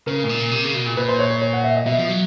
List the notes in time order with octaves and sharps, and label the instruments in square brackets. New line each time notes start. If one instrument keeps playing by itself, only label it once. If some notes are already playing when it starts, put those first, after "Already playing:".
[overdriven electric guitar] C#3 [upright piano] A#4
[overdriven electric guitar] A2
A#2
C3
C#3
B2
A#2
[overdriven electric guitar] A#2 [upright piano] B4
[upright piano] C5
C#5
C#5
C#5
F#5
E5
D#5
[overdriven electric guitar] B2 [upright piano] E5
[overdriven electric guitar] F3
F#3